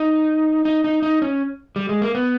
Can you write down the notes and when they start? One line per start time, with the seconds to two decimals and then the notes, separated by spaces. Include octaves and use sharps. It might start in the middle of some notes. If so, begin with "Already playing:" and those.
Already playing: D#4
0.65 D#4
0.84 D#4
1.02 D#4
1.22 C#4
1.76 G3
1.89 G#3
2.02 A#3
2.15 B3